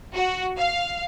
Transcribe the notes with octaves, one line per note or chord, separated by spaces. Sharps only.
F#4
F5